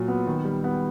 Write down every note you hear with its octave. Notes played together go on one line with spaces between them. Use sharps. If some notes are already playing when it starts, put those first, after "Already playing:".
Already playing: A#2 F#3
B3
D#3
G3
B3